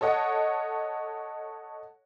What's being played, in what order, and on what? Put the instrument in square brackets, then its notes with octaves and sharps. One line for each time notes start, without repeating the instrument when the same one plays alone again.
[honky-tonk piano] A4 C#5 D#5 F#5